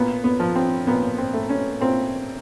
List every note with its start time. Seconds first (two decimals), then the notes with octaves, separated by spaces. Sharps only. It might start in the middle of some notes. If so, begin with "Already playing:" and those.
Already playing: A#2 B3
0.24 B3
0.40 F3
0.56 C4
0.87 A#2 B3
1.18 C4
1.33 A3
1.49 C#4
1.81 A#2 C4